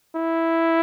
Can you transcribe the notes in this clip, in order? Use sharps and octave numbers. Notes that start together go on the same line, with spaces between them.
E4